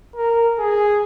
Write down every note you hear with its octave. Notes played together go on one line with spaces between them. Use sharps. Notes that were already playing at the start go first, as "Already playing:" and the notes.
A#4
G#4